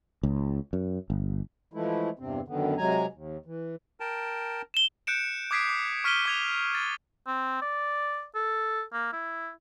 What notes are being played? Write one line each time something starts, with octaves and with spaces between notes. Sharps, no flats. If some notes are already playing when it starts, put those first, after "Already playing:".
C#2
F#2
G1
E3 F3 G#3 A3 E4
E2 G2 C3 C4
F#2 D3 D#3 B3
C3 F#3 G#3 G#5 A#5
D#2
E3
A#4 G5 A5
E7 G7
F#6 G6 C#7 D7 E7
D6 D#6 G#6 B6 C7 D7
D6
C#6 F6 B6 D7 D#7 G7
D6 G#6 F7
A6
C4
D5
A4
A#3
E4